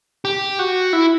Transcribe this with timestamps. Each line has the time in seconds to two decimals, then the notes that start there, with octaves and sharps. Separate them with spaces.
0.25 G4
0.59 F#4
0.93 E4